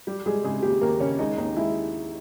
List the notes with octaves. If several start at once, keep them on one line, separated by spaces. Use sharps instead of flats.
G3 G4
G3 G#3 G#4
C#3 G#3 G#4
D#2 G4
D#2 A#3 A#4
C#3 C#4 C#5
G#3 D#4 D#5
D#2 D#4 D#5
G#3 E4 E5